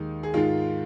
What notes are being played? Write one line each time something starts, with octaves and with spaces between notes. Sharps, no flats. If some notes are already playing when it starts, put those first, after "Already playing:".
Already playing: D#2 D#3 G#3 D#4
G#4
G#2 D#3 G#3 F4